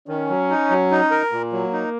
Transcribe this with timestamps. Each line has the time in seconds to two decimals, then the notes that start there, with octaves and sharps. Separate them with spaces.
0.08 D#3 C#4
0.29 F#3
0.50 D#4
0.70 F#3
0.91 D#4
1.11 A#4
1.32 A#2 A#3
1.53 F#3
1.73 D#4